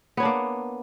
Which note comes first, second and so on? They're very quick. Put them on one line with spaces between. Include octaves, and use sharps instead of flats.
B3 C#5 D4 A#3